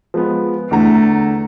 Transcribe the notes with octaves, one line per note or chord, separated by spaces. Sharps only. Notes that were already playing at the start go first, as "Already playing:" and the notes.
F3 G#3 B3
E2 D3 A3 A#5